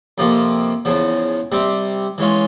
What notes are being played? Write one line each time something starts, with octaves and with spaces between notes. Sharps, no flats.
F2 C3 F3 A#3 F4
E2 C#3 F3
C3 G3 C4
E3 G#3 C#4 F4